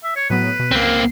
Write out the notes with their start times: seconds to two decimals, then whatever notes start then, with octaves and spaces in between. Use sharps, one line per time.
0.04 E5
0.16 C#5
0.30 A2 F#3 B3 B4
0.59 B2
0.71 C#2 A#3 C4 C7